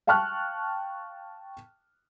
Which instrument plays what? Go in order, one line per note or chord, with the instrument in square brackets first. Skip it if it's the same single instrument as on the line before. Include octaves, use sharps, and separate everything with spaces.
[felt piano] F5 G5 A5 C#6 F6 F#6